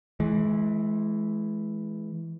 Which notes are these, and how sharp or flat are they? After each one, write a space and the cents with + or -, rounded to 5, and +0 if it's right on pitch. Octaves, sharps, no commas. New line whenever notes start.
E3 +0 G#3 +35